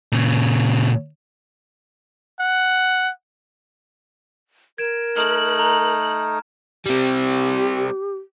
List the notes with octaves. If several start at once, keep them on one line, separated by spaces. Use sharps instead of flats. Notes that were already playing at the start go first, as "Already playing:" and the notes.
A#2 C#3
F#5
A#4 G#6 D7 E7
A3 D#4 F6 F#6
A#5
G3 C4 G4